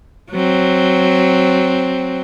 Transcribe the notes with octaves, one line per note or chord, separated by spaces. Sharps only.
F#3 C4